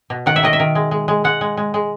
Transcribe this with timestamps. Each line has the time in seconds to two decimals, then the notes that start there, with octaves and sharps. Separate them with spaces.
0.10 B2
0.26 D#3 F#5
0.36 E5
0.43 D#3 D#5
0.53 E5
0.60 D#3
0.75 G#3
0.91 G#3
1.08 G#3
1.24 G#3 F#5
1.41 G#3
1.57 G#3
1.74 G#3